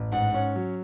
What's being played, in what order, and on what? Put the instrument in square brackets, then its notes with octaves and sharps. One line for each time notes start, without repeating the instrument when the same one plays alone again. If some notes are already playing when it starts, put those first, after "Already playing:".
Already playing: [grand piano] A1
[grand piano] G#2 [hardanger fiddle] F#5
[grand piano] C#4
F#3